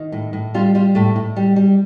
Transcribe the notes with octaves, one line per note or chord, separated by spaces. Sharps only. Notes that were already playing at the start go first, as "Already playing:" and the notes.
Already playing: D#3
A2
A2
G3 F4
G3 F4
A2 A3
A2
G3
G3